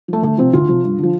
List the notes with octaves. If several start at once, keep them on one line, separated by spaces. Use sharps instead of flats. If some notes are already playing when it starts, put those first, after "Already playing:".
F3 A3
D2 A3
C3 F3 C4
D2 F4
C3 F3
G2
D3 F3